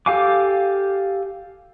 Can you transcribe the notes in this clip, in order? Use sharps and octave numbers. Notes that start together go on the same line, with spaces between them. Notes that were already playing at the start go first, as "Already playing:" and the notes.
G4 A4 F5 G#5 D6